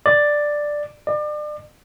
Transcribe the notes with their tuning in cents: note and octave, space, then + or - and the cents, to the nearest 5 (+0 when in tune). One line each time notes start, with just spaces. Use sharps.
D5 +5
D5 +35